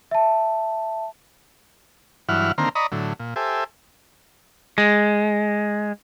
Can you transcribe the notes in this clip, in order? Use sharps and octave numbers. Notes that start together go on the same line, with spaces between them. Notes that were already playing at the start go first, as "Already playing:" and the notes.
E5 A5
G2 E3 F#3 E4 F#5 F6
D3 D#3 A#3 C4 A#5 C6
D5 D#5 A#5 B5 C#6 D#6
A2 D3 F#3
A#2
G4 A4 C5 E5 G#5
G#3